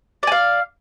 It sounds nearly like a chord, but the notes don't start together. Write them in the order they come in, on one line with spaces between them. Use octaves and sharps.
D5 G#5 F5